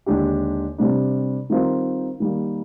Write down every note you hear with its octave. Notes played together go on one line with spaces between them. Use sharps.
D#2 D3 G#3 D4 G4
C3 G3 D4
D#3 G3 C4 F4 A#4
D#3 G3 A#3